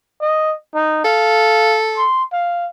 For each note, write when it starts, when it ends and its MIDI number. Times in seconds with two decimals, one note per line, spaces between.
0.21 0.56 75
0.74 1.00 63
1.05 2.05 69
1.05 1.75 77
1.97 2.24 84
2.33 2.67 77